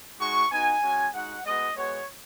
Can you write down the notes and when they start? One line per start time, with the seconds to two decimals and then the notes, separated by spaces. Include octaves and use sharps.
0.20 G#3 D#4 F#4 C#6
0.51 B3 D#4 F#4 G#5
0.82 G#3 C#4 F#4
1.14 G#3 D#4 F#4 F#5
1.45 G#3 B3 F#4 D#5
1.76 G#3 B3 F#4 C#5